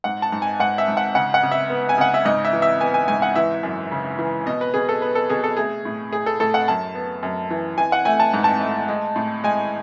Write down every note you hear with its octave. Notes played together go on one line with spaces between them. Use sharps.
G#2 F#5
A5
G#2
G#5
G#2 F#5
E5
G#2
F#5
C#3 F#5
F#5
C#3
E5
B3
G#5
C#3 F#5
E5
G#2 D#5
E5
E3
E5
B3 G#5
G#5
G#2 G#5
F#5
E3 E5
F#2
C#3
E3
B2 D#5
B4
B2 G#4
A4
B3 B4
A4
B2 G#4
A4
A3 G#4
A2
A2 G#4
A4
A2 A4
F#5
F#2 A5
B3
F#2
E3
E3 G#5
F#5
A3 G#5
A5
G#2
A5
A3
G#3
A2
G#3 G#5